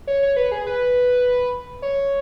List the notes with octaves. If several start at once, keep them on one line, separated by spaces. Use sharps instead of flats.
C#5
C#5
B4
G#4
B4
C#5